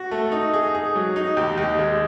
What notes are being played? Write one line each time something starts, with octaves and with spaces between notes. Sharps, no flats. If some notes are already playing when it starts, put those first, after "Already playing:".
Already playing: F#4
A3
D#4
G#4
G#4
F#3
D#4
D#2
D#2
G#3